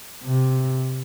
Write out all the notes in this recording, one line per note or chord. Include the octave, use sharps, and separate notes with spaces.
C3